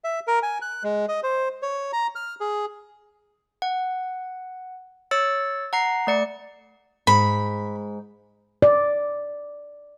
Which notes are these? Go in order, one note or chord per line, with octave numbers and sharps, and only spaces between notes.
E5
A#4
G#5
F#6
G#3
D#5
C5
C#5
A#5
F6
G#4
F#5
C#5 E6 A6 C#7
F#5 A#5 C7
A3 D5 C#7
G#2 B5
D5